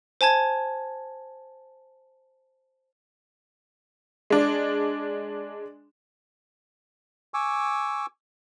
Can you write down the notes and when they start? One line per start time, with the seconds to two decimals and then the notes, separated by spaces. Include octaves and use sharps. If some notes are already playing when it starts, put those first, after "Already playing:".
0.21 C5 G#5 A5 G#6
4.30 G#3 D4
7.34 G#5 C#6 D6 E6